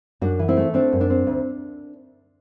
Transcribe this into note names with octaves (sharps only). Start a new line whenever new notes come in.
F#2 D4 F#4
E3
C4 E4
A3
C4 D4
F#2
D4
C4
D2